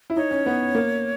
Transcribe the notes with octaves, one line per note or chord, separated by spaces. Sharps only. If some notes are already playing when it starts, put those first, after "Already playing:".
E4
D#4 C#5
C#4
B3
A#3